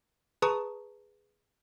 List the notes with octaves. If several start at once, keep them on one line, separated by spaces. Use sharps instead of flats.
G#4 B4 A5 A#5 C#6 D#6